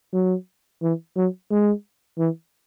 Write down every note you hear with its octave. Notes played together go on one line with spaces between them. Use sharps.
F#3
E3
F#3
G#3
E3